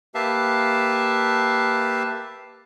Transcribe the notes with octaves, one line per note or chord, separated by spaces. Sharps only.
A#3 G4 B4 E5 F5 A5